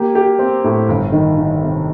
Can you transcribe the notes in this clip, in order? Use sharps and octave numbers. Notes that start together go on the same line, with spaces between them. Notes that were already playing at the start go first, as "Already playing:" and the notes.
Already playing: A#3 G4
G4
C4
A2
G1
D#3
D#3
C3